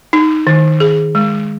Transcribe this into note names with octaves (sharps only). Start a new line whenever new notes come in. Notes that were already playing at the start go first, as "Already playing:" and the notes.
D#4
D#3
G#4
G#3